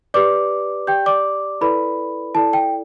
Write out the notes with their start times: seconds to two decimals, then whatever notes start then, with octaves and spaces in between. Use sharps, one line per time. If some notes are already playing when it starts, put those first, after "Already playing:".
0.14 G4 B4 D5 D6
0.87 G4 D5 G5 G6
1.06 D5 D6
1.61 E4 A4 B4 D5 B5
2.35 E4 A4 D5 A5
2.53 G5